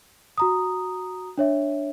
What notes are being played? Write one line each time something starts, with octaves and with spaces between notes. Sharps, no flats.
F#4 A#5 D#6
D4 C#5 E5